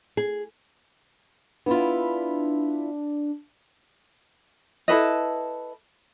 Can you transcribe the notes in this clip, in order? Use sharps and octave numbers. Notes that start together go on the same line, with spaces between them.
G#4
B3 D4 E4 F4
E4 A4 B4 D#5